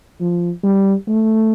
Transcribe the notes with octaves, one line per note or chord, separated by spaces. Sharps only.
F3
G3
A3